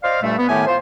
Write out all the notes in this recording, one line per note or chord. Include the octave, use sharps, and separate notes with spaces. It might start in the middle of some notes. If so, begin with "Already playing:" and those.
C5 D5 D#5 F5
G2 A#2 G3 A3
B3
A2 D#3 A3 B3 G4 G#5
F4 C5